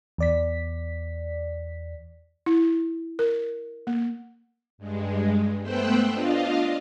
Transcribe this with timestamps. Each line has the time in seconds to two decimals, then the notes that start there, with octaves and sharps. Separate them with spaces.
0.18 E2 D5 B6
2.46 E4
3.19 A#4
3.87 A#3
4.78 G2 G#3
5.62 A3 B3 C5 G5 E6 F#6
6.12 D4 F4 D#5 F5